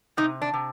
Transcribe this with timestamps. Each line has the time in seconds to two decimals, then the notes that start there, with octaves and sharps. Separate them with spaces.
0.17 C3 D#4
0.42 D4
0.54 C3